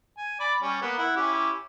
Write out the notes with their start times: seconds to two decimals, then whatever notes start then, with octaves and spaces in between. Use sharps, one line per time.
0.18 G#5
0.40 D5 B5
0.62 G3 C#4
0.82 A#3 B3
0.98 E4 F#5
1.16 C#4 E4 G4